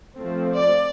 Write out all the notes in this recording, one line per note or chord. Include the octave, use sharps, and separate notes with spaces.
F3 A3 C4
D5